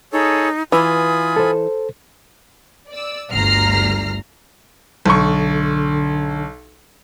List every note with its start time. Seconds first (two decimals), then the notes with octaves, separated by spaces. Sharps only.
0.13 D#4 G#4 A4 C#5
0.72 E3 F4 G#5 B5 D#6
1.36 A4 C5
2.89 D5 E6
3.31 G1 D2 G2 A#5 F6 C7
5.06 B1 D3 C#6